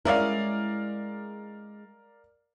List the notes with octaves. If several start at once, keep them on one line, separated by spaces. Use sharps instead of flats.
G#3 C#4 E4 A#4 D5 F5